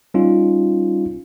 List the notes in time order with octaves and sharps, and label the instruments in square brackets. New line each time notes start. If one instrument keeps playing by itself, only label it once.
[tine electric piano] G3 C#4 D#4 F4